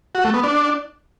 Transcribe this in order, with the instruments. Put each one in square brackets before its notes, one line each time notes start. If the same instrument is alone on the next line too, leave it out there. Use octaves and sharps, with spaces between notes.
[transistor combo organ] F#4
A3
B3
D4